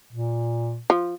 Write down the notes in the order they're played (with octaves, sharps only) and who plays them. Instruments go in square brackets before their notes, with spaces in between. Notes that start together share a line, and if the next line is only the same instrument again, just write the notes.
[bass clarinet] A#2
[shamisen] F3